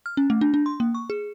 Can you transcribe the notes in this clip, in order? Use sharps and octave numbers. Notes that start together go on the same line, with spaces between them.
F6
C#4
A3
D4
D4
C6
A#3
C#6
G#4